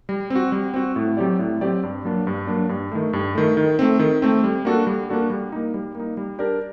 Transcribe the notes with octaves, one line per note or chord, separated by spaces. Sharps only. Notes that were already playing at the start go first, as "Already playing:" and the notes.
G3
C4
F#4
G3
C4 F#4
A2
F#3 C4 G4 D5
A2
F#3 C4 G4 D5
G2
F#3 A#3 D4
G2
F#3 A#3 D4
G2
D#3 A3
G2
D#3 A3
D#3
A3 C4
D#3
A3 C4
G3
A#3 D4 F#4 A4
G3
A#3 D4 F#4 A4
G3
A#3 D#4
G3
A#3 D#4
G3
D4 G4 A#4 D5